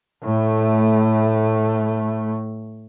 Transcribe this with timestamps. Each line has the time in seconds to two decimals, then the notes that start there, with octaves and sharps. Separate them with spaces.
0.24 A2 A3